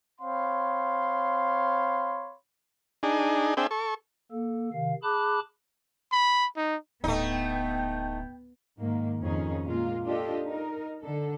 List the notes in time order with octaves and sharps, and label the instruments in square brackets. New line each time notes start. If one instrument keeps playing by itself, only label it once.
[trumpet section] C4 C#5 F5 B5 C6
[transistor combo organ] D4 D#4 G#4
C4 D4 G#4 E5 G5
A4 C#6
[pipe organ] A#3 A4
C3 D#3 F5
G#4 A5 B5 D6 F#6
[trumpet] B5
D#4
[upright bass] D1 [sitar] A3 D#4 [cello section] B3 [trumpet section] G5
[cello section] G#2 D#3 A#3
F2 D#3 C#4 D#4 G#4
A#2 G#3 A#3 F4
D4 F4 G4 A4 D#5
D#4 A#4
D3 A4